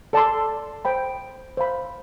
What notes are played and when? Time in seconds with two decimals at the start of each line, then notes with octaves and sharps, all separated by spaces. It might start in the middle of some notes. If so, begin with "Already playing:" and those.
0.13 A4 D5 A5 C6
0.85 C5 G5 B5
1.57 C5 F5 B5